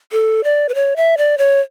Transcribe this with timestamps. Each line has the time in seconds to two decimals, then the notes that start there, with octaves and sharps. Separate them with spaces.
0.12 A4
0.44 D5
0.69 B4
0.75 C#5
0.96 E5
1.18 D5
1.38 C#5